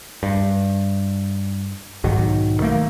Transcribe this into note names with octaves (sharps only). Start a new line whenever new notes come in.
G2
B1 G#2 D#3 F#3
D#3 A3 A#3